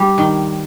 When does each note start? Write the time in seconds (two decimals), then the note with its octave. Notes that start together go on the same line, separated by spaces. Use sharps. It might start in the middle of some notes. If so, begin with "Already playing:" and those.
Already playing: G3 G4
0.18 D#3